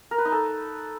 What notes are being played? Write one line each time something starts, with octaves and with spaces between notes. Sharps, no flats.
A#4
B4
D#4
A4